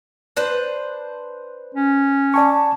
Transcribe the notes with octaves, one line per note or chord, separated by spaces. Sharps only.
D4 B4 C5
C#4
D5 G#5 A5 C#6